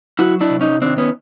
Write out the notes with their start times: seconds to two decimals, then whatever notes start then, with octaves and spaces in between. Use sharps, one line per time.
0.19 F#3 E4 F#4
0.41 D4 E4
0.50 C3
0.61 C#4 D#4
0.82 D#3 C4 D4
0.98 B3 C#4